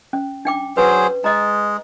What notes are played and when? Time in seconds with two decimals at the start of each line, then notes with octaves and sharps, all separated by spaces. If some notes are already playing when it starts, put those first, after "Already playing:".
0.13 C#4
0.45 D4 G5 D6
0.77 F#3 G#4 B4 C5
1.24 G#3 D#5 A#5